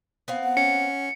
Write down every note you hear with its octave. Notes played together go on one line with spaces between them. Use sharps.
B3 C4 F5
F#5
C#4 C#7